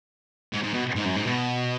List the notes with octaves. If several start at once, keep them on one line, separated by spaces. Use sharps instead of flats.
G#2
G#2
B2
G#2
F#2
G#2
B2